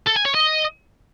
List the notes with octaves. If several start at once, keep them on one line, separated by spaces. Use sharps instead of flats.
A4
G#5
C#5
D#5